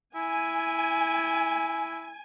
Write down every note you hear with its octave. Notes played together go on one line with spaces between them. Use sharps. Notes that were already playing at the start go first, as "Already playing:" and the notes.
E4 G#5